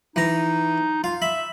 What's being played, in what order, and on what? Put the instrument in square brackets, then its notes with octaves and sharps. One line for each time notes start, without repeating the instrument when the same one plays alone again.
[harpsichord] E3 A#5 [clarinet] D#4
[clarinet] F4 [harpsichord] F5
[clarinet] E5 [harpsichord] B5